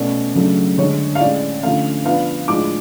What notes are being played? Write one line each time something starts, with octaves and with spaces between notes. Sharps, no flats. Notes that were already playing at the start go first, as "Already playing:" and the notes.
Already playing: B2 A3 C#4 D5
C#3 F#3 A3 D4
D3 G#3 D4 C#5
F5
A2 G#3 C#4 D5
D3 F3 A3 C#4 F5
F3 B3 D4 F5
A2 F3 G#3 D4 D6